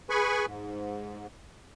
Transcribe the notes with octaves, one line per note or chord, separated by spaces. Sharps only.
G#4 B4 G#5 B5 C#6
G#2